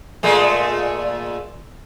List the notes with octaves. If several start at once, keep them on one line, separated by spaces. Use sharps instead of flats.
A#2 G#3 A3